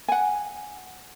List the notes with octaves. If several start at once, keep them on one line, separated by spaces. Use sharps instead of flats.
F#5 G#5